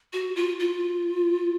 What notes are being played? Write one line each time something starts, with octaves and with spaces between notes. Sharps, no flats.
F#4
F4
F4